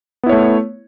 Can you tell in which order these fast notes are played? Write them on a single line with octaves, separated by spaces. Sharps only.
B3 E4 C#5 A3